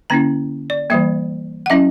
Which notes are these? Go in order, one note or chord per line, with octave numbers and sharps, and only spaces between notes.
D3 A#3 C#4 E4 A#5
D5
E3 G3 A#3 E5
F#5
F#3 C#4 E4 E5